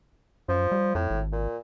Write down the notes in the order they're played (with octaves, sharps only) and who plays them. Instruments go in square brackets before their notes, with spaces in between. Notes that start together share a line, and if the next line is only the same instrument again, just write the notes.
[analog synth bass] F#2 [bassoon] F3
[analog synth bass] G3
[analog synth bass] F2 [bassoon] A2
[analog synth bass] G#1
[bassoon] A#2